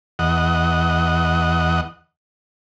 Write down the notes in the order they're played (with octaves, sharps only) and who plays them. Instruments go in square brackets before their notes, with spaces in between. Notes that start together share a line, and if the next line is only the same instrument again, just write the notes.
[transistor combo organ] E2 D#5 F#5